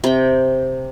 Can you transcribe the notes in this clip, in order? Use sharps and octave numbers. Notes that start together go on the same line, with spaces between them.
C3 G5